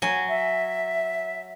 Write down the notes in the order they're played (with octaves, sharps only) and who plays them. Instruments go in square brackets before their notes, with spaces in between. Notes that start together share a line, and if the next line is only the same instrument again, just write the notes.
[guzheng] F#3 G#5
[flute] E5